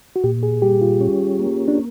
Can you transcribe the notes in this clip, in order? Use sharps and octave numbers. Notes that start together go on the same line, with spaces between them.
F#4
A#2 G4
G#4
G3 G4
F4
C#4
A#3
D4